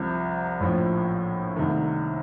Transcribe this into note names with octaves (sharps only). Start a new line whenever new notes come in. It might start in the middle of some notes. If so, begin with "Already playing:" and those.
Already playing: C2 C3 F3 C4
A#1 A2 F3
C2 C3 D#3 A3